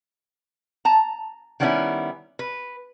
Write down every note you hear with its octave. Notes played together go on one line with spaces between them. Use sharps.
A5 A#5
D#3 G3 B3 C#4 D#4 E4
B4